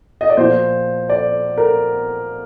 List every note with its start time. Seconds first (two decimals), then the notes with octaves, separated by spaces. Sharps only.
0.21 D#5
0.30 D5
0.37 A#2 F3 C5
1.10 D5
1.58 A#4